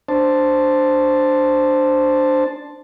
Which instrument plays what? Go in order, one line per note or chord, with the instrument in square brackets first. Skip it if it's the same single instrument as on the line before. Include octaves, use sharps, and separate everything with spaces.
[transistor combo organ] D4 C5 A5